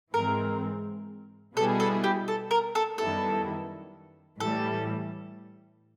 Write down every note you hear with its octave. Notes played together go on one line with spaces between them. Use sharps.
G#2 E3 G#3 C4 A#4
B2 G3 B3 E4 G#4 A4
A4
G4
A4
A#4
A4
F#2 D#3 G3 B3 E4 A4
A2 E3 G3 A4